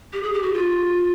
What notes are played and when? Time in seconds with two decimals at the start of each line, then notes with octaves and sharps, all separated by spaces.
0.13 G4
0.23 G#4
0.33 G4
0.43 F#4
0.53 F4